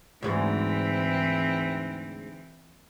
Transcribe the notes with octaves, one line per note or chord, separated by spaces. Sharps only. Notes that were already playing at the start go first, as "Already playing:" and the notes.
D2 G#2 E3 C4